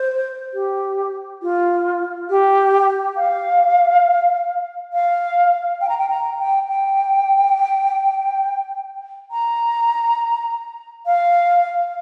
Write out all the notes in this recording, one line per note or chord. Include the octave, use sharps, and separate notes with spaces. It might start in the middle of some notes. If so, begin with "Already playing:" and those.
Already playing: C5
G4
F4
G4
F5
F5
G5
A#5
G5
A#5
G5
G5
A#5
F5